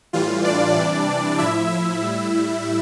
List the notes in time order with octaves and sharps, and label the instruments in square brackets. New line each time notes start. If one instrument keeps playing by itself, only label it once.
[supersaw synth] A2 E3 G3 F4
D4 D5
C3 E3 G3
A2 F3 E4 E5
E4 E5
A2 G3